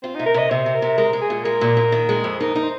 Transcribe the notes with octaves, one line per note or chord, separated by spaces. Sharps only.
C4 F4
C3 D#4
A#4
C3 D#5
C3 C5
C3
A#4
C3
G#3 A#4
G#3
G#4
A#2
G#3 A#4
A#2
A#2
D#3
G#3
F2
D#4 A#4
D#4
C5